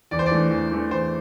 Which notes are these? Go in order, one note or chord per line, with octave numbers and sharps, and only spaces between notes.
E2 D5
C5
D5
E3 A3 D4
E2
E3 A3 D4
E2 C5